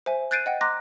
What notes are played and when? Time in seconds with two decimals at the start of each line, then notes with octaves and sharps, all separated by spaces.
0.06 C5 E5 G#5
0.31 F#6 G6 A6 C7 D7 D#7
0.46 D#5 F#5 G5
0.61 A#5 C6 D6 F#6 A#6